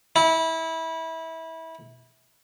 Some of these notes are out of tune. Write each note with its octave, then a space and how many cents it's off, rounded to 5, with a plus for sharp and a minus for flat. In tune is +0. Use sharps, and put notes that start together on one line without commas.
E4 -25